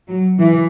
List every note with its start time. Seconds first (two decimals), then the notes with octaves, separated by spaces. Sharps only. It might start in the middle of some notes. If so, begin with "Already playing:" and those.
0.09 F#3
0.39 E3